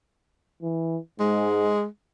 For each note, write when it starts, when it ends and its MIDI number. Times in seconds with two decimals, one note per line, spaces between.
0.62 0.98 52
1.20 1.75 44
1.20 1.85 56